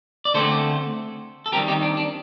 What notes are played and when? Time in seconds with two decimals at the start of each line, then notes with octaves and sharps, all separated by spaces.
0.25 D5
0.34 D3 A3 C4 A4 C5
1.46 A4
1.52 D#3 G3 C4 G4 A#4
1.68 D#4 G4
1.82 D4
1.97 D4